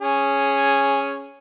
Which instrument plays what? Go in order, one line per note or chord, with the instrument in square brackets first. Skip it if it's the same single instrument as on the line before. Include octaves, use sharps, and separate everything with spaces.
[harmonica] C#4 G#4